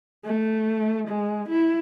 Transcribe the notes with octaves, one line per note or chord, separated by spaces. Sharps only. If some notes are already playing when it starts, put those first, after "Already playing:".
A3
G#3
E4